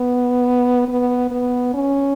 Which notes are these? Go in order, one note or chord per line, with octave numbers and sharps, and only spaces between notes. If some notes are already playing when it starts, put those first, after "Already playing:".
Already playing: B3
B3
B3
C#4